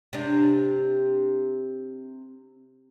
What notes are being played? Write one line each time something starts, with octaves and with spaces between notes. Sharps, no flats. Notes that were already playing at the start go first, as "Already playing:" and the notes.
C3 D4